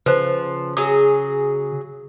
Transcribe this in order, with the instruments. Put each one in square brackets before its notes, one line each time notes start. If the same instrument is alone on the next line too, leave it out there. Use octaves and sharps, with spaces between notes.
[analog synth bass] C#3 [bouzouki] F3 [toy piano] B4 C5
[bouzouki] F#3 G#4 [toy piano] D#6